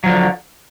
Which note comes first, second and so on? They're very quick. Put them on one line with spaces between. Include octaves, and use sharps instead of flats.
F#3 F3 D3